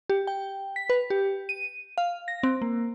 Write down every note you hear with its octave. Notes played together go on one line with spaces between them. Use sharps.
G4
G5
B6
B4
G4
D#7
F5
A#6
C4
A#3